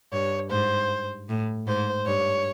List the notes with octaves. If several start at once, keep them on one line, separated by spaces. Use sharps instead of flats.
G2 C#5
G#2 C5
A2
G#2 C5
G2 C#5